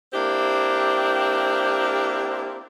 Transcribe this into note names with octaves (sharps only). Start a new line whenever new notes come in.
A#3 C4 D4 E4 G4